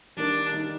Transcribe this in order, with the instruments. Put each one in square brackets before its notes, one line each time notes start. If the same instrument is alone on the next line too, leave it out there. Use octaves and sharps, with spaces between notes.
[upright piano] D#3 G3 A#3 D#4 A#4 [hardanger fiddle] D4
[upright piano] D#3 G3 A#3 D#4 A#4